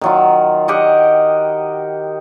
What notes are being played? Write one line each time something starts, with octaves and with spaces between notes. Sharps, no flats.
D#3 F#3 F4
G4 A#4 D#5 F#5